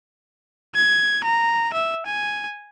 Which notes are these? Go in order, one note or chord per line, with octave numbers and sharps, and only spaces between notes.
G#6
A#5
E5
G#5